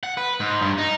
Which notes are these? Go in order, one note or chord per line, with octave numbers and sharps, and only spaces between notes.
F#5
B4
G#2
G2
D#4